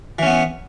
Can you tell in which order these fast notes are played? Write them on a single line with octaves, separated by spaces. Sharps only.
E3 C#4 B3